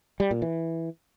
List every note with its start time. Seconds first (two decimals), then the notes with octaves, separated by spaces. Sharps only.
0.20 G3
0.31 A#2
0.42 E3